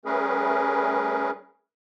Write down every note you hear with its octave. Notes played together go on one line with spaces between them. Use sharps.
G3 A3 C#4 G#4 A#4 B4